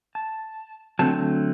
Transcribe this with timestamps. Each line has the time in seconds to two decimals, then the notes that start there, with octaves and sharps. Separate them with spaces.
0.15 A5
0.99 D3 F#3 A3 C4 A5